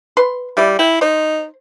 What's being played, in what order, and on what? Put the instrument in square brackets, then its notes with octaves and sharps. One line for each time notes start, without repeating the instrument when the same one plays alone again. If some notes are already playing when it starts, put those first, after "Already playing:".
[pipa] B4 C6
[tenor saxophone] G3 [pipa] E4 D5
[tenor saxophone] E4 [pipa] G5
[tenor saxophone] D#4 [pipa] C5